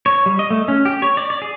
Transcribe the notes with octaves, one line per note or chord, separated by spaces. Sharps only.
C#5
G3
D#5
A3
C#4
G4
C#5
D5
D5
G#4